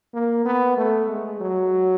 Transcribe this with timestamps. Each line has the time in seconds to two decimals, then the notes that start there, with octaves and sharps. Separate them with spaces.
0.14 A#3
0.46 B3
0.77 A3
1.09 G#3
1.41 F#3